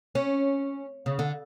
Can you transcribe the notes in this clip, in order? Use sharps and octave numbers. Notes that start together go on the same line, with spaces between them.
C#4
C#3
D3